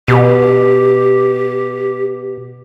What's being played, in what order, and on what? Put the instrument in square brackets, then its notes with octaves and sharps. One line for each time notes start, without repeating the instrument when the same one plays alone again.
[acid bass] B2 [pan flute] G4